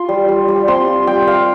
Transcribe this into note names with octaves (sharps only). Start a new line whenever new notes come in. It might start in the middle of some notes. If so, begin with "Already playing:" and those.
Already playing: F4 C6
G3
G3
G3
C4 C6
F4
G3 G5
G3 F5